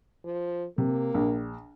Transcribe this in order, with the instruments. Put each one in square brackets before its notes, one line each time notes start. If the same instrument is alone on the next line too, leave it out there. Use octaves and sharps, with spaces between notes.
[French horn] F3
[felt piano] C3 [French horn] A#3
[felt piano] A#1